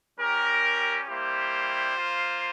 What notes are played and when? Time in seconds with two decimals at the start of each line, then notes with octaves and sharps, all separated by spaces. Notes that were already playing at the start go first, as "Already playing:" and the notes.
0.19 G3 C#4 G4 A#4
1.08 G3 A#3 E4 G4 C5
1.97 A#3 F4